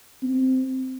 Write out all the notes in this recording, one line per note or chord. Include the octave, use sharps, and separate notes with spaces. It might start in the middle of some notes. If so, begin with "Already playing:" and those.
C4